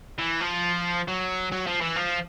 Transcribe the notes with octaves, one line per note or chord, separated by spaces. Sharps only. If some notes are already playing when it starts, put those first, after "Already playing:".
E3
F3
F#3
F#3
F3
E3
F3